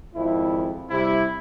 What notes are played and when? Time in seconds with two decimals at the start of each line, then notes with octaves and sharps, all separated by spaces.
0.15 G#1 F2 E4
0.90 C3 G3 E4